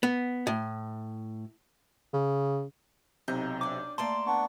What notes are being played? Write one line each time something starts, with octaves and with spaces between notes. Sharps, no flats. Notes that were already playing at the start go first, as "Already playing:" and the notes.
B3
A2
C#3
B1 C3 D#4 G6
C#4 D4 D6
A3 A#3 D5 A5 C6
B3 D4 C#6